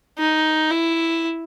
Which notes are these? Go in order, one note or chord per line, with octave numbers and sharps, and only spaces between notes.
D#4
E4